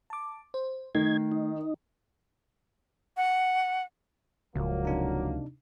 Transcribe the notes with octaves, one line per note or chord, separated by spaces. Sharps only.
A5 D6
C5
D#3 A3 D#4 G#6
D#4
F#5
D1 C#2 F3 F#3 A#3
C3 D4 D#4